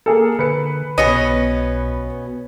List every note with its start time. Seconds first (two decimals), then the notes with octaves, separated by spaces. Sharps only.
0.06 A#3 G#4 A4
0.39 D3 B4 C#7
0.98 B1 B2 B3 C#4 D#5